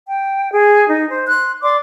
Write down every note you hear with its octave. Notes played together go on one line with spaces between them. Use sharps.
G5
G#4
D#4
C5
C6 F#6
D5 C6 D6